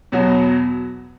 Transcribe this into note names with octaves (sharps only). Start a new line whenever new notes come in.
E2 B2 F#3 B3 F#4